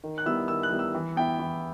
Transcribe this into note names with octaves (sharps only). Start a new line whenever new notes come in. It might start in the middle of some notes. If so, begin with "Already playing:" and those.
D#3
F#6
G3 B3 E4 E6
D#3 E6
F#6
G3 B3 E4
E6
E3
B3 E4 G5
E3